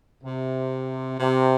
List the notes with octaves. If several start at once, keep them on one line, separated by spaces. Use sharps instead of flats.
C3
C3